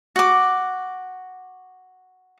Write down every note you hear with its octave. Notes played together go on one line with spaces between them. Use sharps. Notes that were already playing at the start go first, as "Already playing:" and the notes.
F#4 D6